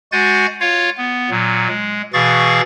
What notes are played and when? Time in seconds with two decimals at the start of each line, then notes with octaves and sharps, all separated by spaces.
0.12 G#3 F#4 F#5 G#5 G6 A6
0.60 F4 C#5 F5
0.97 B3
1.30 A#2 F#3
1.68 G#3
2.13 B2 E3 G#4 F5 C#6 A6